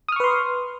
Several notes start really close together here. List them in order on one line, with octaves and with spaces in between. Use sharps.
D#6 F6 C#6 B4 C6